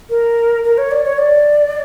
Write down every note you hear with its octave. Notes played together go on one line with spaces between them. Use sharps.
A#4
A#4
C#5
D5
C#5
D5